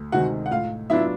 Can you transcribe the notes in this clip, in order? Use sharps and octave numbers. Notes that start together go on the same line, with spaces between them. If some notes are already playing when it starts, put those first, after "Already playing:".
Already playing: D2
C3 D#3 G#3 F#4 F#5
F#5
A2 F4 F5
F#3 B3 D4 E4 F4 E5